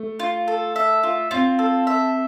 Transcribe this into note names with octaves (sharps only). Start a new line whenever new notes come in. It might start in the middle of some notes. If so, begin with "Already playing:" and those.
Already playing: A3
F4
A4
E5
F4
C4 F4
A4
E5